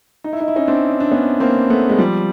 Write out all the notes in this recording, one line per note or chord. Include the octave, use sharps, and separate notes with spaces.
D#4
E4
D#4
E4
C#4 D#4
C4 D4
D4
B3 C#4
A#3 C4
A3 B3
G#3
F3 G3